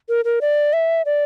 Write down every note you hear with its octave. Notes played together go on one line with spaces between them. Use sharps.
A#4
A#4
D5
E5
D5